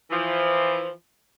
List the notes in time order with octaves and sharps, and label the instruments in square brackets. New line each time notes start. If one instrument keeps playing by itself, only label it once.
[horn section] E3 F3